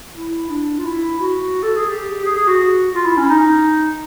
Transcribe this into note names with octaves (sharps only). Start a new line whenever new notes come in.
E4
D4
F4
E4
F#4
A4
G#4
G4
G#4
G#4
F#4
F4
E4
C#4
D#4